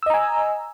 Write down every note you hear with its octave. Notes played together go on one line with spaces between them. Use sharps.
D#5 G#5 A#5 E6